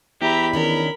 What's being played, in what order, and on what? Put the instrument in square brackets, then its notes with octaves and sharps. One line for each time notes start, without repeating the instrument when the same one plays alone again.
[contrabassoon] E2 [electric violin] G4 A#5 [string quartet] E5 B5
[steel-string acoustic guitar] D#3 C#4 D4 [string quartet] A#4 [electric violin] B5